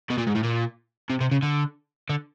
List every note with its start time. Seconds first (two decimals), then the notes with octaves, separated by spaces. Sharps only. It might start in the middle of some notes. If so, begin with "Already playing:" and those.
0.10 B2
0.18 A#2
0.27 G#2
0.35 A2
0.43 A#2
1.10 C3
1.21 C3
1.32 C#3
1.42 D3
2.10 D3